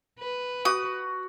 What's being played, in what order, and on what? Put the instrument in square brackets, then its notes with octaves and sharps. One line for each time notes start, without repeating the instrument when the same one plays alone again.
[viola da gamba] B4
[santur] F#4 [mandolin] D#6